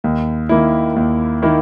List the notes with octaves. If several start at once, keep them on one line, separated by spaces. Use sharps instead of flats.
D#2
D#3 A#3 E4
D#2
D#3 A#3 E4